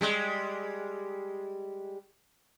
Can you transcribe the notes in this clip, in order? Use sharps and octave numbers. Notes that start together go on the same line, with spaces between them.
G3 G#3